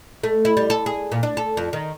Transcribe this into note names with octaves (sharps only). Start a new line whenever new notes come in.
A3
E4
G3
A4
G#4
A#2
D4
A4
F2
D#3